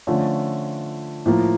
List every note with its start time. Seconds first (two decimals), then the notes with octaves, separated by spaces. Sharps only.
0.07 D3 F3 A3 C#4 F4
1.26 A2 F3 A#3